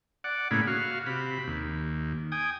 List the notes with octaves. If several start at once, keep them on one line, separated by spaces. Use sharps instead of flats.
D5 F#5
A2 C#3 A#3 G#4 B5
F#4 F5
C3 B5
D#2
G5 G#5 D#6